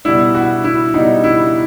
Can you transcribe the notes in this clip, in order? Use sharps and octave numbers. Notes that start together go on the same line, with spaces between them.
B2 G3 E4
F#4
E4
B2 G3 D#4
E4